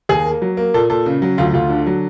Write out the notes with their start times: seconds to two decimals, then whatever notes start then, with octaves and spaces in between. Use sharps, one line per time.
0.09 D#2 G#4
0.25 A#3
0.42 F#3
0.57 A#3
0.74 A#2 A4
0.90 A#2 A4
1.06 C#3
1.22 F#3
1.38 D2 F4
1.53 D2 F4
1.70 D3
1.86 F#3